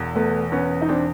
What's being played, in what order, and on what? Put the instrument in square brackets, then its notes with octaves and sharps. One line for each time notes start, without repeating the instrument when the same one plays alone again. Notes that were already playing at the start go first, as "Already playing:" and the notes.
Already playing: [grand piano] E1 E2
[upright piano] A3 B3
B3 C#4
D#4
C4 D4